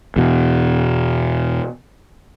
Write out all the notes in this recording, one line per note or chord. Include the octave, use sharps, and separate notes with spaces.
E2 B2